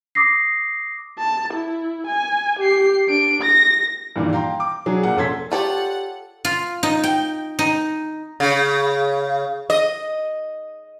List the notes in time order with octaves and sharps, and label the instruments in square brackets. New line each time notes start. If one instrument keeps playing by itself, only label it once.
[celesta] D6 D#6 A#6 C7
[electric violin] A5
E4
G#5
G4 C7
D4 D7
A#6
[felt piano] G2 A#2 D#3 E3
F5 G5 A#5 C6
D6
F#3 D4 G#4
A#2 F#5
F1 C#4 A4 C6 G#6 B6
[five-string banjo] F4 A4 C#5 [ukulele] G4 D5 [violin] F#5
[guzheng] F4
D#4
G5
D#4
[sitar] C#3
D#5